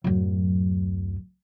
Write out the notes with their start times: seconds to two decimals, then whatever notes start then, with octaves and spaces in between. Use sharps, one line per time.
0.04 D1 F#2